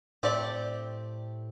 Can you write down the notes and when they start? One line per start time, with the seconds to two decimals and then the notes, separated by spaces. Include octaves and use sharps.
0.23 A2 A3 C4 G4 D5